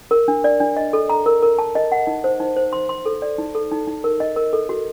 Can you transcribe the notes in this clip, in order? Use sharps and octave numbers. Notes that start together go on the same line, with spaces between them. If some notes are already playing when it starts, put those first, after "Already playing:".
A#4
D4
D5
D4
D#5
A4
A#5
A#4
A#4
A5
D#5
F#5
D#4
C5
D#4
C5
C6
C6
A4
D5
D#4
A4
D#4
D#4
A#4
D#5
A#4
A4
F#4